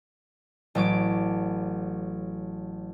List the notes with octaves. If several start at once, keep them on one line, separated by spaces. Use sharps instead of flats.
A1 F#3 D6 D7